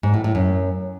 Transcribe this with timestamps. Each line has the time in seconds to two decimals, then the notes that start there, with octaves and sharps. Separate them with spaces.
0.03 G#2
0.14 A2
0.24 A2
0.35 F#2